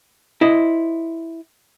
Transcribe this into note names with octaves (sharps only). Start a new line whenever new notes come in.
E4 C5 D#5